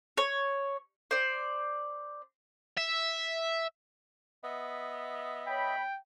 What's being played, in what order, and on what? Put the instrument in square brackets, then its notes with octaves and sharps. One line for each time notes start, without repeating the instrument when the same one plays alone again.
[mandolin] C#5
C5 D5
[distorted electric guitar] E5
[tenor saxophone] B3 [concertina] D#5 E5
[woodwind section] C#5 B5 [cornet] G5